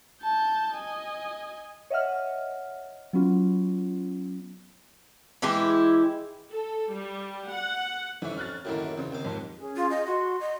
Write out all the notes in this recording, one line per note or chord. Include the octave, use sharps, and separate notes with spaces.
A5 G6
D#5 G#5
C#5 D#5 E5 F#5 F6
F#3 B3 C#4 F4
E3 G#3 E4 G4
A4
G3
F#5
F2 E3 C#4 E5
F6 F#6 A6
F#2 A2 D#3 A#3 E4 G4
E2 C#3 C4
D#2 F5
F2 G#2
C#4 G#4
F4
D#5
F#4 C6
D#5